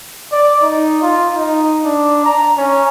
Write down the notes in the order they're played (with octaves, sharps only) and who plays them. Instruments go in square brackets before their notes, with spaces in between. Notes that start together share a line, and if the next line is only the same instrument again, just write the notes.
[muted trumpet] D5
D#4
F4
D#4
D4
A#5
C#4